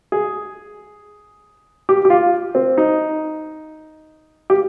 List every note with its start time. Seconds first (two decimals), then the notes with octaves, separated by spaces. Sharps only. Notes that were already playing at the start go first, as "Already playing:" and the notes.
0.12 G#4
1.89 G4
2.05 G4
2.10 F4
2.55 C4
2.78 D#4
4.50 G4